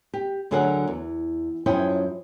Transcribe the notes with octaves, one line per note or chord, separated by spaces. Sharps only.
G4
D2 D3 F#3 G#4 A#4 F#5
E2
F#2 F3 E4 C#5 D#5 G5